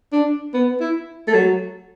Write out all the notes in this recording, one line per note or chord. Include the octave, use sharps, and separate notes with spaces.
D4
B3
E4
A3
F#3